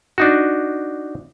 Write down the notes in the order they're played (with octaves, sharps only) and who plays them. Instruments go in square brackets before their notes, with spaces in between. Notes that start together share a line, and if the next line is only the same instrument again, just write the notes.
[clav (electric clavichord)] D4 D#4 F#4